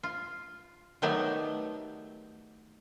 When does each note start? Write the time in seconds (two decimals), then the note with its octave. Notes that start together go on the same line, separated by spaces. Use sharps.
0.03 F4
1.02 D#3 F#3 A3 B3 G4 D5